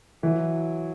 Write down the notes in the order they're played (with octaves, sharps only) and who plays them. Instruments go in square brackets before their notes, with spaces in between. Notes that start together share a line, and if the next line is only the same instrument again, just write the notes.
[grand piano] E3 [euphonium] F#3